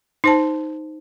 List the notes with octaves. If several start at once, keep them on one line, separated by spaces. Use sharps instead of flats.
D#4 C5 A5